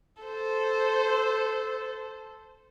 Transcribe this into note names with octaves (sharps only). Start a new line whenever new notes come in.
A4 C5